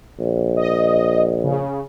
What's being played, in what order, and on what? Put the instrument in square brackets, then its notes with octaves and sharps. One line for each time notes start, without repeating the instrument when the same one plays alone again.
[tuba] A#1
[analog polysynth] D#5
C#3